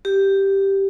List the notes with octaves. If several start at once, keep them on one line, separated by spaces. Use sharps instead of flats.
G4